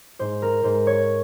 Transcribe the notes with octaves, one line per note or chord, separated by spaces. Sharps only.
G#2 C5
A#4
G#2 C5
C#5